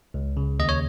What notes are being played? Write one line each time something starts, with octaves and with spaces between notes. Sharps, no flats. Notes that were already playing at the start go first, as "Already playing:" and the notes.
C#2
C#3
D#2 D#5
C#5